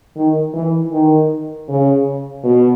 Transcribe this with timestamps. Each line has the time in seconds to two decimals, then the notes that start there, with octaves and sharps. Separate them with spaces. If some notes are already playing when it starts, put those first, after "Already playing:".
0.16 D#3
0.54 E3
0.92 D#3
1.68 C#3
2.44 B2